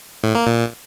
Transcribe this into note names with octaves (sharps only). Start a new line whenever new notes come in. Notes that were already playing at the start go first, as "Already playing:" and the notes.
A2
A#3
A#2